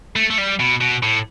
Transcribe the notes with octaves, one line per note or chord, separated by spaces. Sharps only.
A3
A3
G3
B2
B2
A2